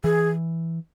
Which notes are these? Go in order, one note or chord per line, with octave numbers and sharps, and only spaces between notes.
E3 G#4